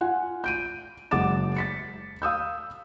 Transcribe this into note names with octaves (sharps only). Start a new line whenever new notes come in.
F4 F#5 G#5
G6 D7 D#7
F#1 G#3 F#5 D6 A6 E7
A6 B6 C#7
F5 D#6 E6 G6